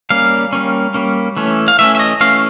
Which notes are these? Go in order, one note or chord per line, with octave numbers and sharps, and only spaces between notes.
G3 A#3 C#4 F5
G3 A#3 C#4
G3 A#3 C#4
E3 A3 C#4
F5
E3 A3 C#4 E5
E5
D#5
E3 A3 C#4 F5